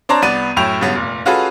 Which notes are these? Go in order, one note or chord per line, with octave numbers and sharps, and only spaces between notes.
C4 D4 C5 C#5 A5 A#5
C2 B3 D5 D#7
F#2 A2 E4 G5 F7
G2 C#3 F#3 B3
F1 A#2
C#4 F4 F#4 G#4 A4 B4